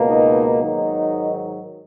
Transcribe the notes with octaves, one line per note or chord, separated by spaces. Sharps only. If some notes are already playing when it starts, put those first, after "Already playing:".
Already playing: C#2 B2 A#3
D#4
G#2 D#3 F#3 D#4